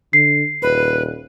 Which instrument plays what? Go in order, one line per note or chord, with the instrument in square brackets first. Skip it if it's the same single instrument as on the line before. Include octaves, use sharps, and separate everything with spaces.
[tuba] D3 [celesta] C7
[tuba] D#1 [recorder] B4